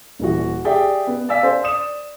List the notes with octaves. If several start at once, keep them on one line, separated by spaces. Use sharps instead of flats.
D#1 E3 F#4
G4 G#4 D5 E5 G5
B3
D5 F5 G#5 E6 B6
C5
D5 D#6 E7